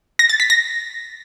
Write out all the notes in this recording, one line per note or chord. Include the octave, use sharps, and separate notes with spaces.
A#6
A6
B6
A#6